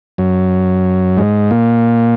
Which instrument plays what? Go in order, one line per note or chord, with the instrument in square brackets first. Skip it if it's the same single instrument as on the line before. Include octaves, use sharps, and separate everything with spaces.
[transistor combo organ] F#2 F#3
G#2 G#3
A#2 A#3